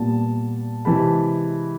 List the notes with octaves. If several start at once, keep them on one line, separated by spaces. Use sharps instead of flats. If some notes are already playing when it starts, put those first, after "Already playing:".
Already playing: A#2 G3 B3 A5
C3 E3 G#3 A5 B5